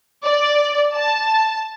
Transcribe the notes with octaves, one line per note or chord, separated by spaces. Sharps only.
D5
A5